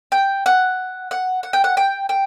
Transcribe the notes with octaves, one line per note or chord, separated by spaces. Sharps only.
G5
F#5
F#5
F#5
G5
F#5
G5
G5